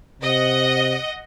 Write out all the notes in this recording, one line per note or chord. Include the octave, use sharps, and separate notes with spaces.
C3 D#5 F#5